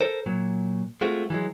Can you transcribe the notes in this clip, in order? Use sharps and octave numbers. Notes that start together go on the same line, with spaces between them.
A4 A#4 C5
A#2 F#3
G#3 A3 C4 F4 F#4
E3 F#3 G#3